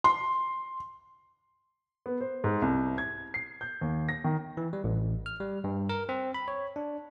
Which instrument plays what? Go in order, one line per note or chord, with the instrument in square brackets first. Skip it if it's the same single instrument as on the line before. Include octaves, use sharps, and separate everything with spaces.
[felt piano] C6
[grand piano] B3
C5
G#2
C2
G#6
C7
G6
D#2
A#6
D#3
[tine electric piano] E3
G3
A1
F6
G3
G2
A#4
C4
B5
C#5
D4